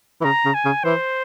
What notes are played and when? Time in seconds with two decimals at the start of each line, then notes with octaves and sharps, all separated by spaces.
0.21 E3
0.25 C#3 A#5
0.45 C#3
0.54 G#5
0.65 C#3
0.84 E3 C5